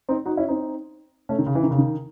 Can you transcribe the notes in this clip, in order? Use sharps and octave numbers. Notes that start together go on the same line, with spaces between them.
C4 D#4
D#4 F#4
C#4 E4
C4 D#4
A3 C#4
D#3
C#3
E3
D#3
C#3
D#3